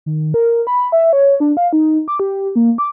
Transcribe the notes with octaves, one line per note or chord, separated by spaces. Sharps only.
D#3
A#4
B5
E5
C#5
D4
F5
D#4
D6
G4
A#3
D6